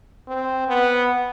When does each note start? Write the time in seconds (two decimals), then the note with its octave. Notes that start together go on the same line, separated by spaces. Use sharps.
0.28 C4
0.68 B3